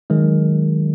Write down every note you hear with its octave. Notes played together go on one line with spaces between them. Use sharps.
D#3 F#3 G#3